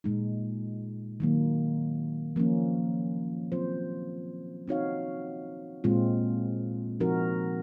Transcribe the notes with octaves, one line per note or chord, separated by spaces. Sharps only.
A#2 G#3 D#4
D#3 F#3 A#3
F3 A#3 C#4
F#3 C4 F4 C5
C4 D#4 F#4 C#5 F5
A#2 G#3 C4 F4
F3 C4 D#4 F#4 A#4